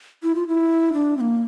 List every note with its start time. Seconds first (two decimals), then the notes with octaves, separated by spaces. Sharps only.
0.23 E4
0.35 F4
0.47 E4
0.93 D4
1.17 C4
1.21 A#3